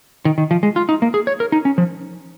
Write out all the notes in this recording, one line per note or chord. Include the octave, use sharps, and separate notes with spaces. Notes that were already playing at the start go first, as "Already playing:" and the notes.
D#3
D#3
F3
G#3
F4
D#4
A#3
G#4
C#5
A#4
D#4
C#4
F3